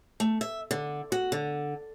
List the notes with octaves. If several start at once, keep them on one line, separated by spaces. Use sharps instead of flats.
A3
E5
D3
F#4
D3